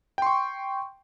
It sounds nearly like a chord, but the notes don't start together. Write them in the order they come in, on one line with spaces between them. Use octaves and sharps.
G5 C6 C#6